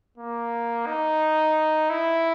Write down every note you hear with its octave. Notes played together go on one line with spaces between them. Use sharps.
A#3
D#4
E4